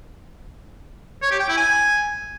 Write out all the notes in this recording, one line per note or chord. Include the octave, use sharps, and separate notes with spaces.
C#5
G4
G5
E4
G#5